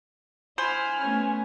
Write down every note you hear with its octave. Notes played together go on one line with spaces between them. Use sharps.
E4 C5 G#5 B5 F6
A3 B3 C#4